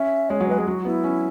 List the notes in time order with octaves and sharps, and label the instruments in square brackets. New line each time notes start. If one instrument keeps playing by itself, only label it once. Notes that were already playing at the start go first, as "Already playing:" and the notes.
Already playing: [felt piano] C#4 [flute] E5
[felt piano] G#3 [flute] C#5
[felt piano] F#3
[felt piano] G#3 [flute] B4
[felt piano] G#3 [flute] G#4
[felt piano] F#3 [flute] F#4
[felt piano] B3 [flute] E4
[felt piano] C#4